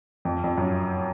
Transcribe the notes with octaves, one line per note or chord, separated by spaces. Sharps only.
F2
F2
F#2